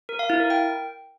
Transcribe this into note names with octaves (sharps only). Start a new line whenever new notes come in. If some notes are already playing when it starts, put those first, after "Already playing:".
A#4
F5
E4
A#4
G5